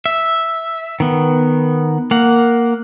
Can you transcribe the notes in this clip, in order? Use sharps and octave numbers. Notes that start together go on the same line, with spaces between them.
E5
D#3 B3
A#3 F#5